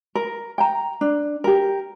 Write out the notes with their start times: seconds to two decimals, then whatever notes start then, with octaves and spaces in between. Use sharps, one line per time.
0.15 A#4
0.58 G5 A#5
1.01 D4
1.44 G4 A#4